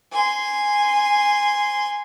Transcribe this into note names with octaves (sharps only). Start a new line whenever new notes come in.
G#5 C6